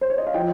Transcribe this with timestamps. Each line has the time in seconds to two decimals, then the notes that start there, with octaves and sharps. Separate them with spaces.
0.01 C5
0.10 C#5
0.18 D#5
0.27 F5
0.34 F3 D#5 G5